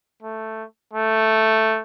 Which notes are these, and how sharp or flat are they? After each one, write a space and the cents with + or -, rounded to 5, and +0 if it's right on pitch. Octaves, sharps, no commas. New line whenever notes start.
A3 +5
A3 +5